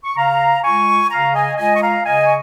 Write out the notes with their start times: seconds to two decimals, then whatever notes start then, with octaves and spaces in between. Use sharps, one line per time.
0.04 C#6
0.16 C#3 F5 A#5
0.63 G#3 F4 G#5 C#6
1.10 C#3 F5 A#5
1.34 D#5 G#5
1.57 G#3 F4 D#5 G#5
1.75 C#6
1.81 F5 A#5
2.04 C#3 D#5 G#5
2.25 C#6